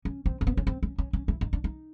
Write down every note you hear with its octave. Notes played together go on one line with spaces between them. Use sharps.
C#4
C4
C4
B3
C#4
C4
C#4
C#4
C#4
E4
D#4
D4
D#4